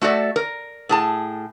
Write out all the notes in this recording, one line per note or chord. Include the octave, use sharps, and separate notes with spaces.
A3 F#4 A4 D5 E5
A#4
A2 G#4 A5